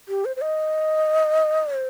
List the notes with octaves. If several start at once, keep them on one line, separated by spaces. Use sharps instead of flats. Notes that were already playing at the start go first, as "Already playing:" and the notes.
G4
C5
C5
D#5
C5